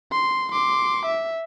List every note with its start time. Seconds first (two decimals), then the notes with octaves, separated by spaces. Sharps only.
0.12 C6
0.52 C6 D6
1.06 E5